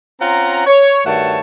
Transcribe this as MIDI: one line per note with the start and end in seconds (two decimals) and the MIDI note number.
0.21 0.64 60
0.21 0.64 61
0.21 0.64 65
0.21 0.64 78
0.21 0.64 82
0.67 1.00 73
1.06 1.40 43
1.06 1.40 51
1.06 1.40 57
1.06 1.40 66
1.06 1.40 73
1.06 1.40 81